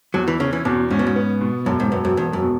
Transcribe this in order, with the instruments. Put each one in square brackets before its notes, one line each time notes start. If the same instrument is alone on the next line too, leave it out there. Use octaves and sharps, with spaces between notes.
[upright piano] E2 [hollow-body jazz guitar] F#3
[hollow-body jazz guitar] E3
[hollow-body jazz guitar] C#3 [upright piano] C#4
[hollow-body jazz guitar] E3
[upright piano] E2 [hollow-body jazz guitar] B2
[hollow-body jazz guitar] G#2 [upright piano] C#4
[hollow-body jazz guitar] B2
G#2
[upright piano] B3
B2
[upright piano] E1 [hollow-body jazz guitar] F#2
[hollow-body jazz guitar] G#2
[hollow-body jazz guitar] F#2 [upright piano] B3
[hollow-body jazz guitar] F#2
[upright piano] E1 [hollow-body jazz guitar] E2
[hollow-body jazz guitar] F#2
[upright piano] B2